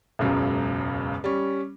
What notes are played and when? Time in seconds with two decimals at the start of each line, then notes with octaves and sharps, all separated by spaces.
0.19 E1 C#2 F#2 C#3
1.24 G3 C#4